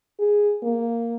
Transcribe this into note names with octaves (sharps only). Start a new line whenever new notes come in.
G#4
A#3